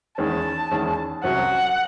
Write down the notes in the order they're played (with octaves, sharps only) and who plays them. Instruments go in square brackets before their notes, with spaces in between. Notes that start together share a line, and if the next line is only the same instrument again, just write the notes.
[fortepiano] E2 D#3 G#3 C#4 [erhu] A5
[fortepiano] E2 D#3 G#3 C#4
[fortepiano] C2 C3 F#3 C#4 F#4 [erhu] F#5